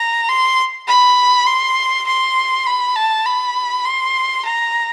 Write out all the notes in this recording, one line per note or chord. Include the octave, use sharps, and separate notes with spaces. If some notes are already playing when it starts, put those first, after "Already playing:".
Already playing: A#5
C6
B5
C6
C6
B5
A5
B5
C6
A#5